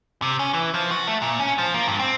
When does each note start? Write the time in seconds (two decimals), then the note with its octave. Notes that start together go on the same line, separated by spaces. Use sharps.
0.22 C3
0.39 C#4
0.54 E3
0.74 F3
0.91 F#4
1.07 A3
1.22 A#2
1.40 C#4
1.58 F3
1.74 A#3
1.88 G2
1.99 C4